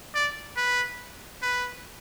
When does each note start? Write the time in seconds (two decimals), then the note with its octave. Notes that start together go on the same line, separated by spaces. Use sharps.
0.15 D5
0.57 B4
1.42 B4